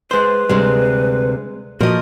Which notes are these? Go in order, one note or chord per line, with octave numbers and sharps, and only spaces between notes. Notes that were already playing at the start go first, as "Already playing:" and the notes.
G#3 B4 C5
D2 C3 G3 G#3
A#2 F3 F#4 A#4 D#5